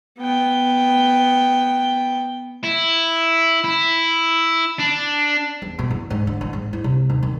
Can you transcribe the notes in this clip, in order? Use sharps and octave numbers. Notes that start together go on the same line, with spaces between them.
B3 G5
E4
E4
D4
E2
B2
E2
G#2
D3
A1
G#2
E4
C3
D#2
D#3